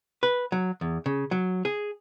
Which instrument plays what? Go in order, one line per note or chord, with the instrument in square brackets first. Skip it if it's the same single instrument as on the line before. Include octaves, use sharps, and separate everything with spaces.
[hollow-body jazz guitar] B4
F#3
E2
C#3
F#3
G#4